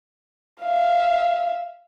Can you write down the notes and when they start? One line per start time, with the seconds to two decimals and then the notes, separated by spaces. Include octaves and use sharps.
0.62 E5 F5